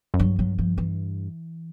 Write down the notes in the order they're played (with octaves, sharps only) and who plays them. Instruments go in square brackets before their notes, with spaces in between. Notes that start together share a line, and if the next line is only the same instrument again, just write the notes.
[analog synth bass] F#2
[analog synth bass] G2 [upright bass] F#3
[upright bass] F#3
F3
E3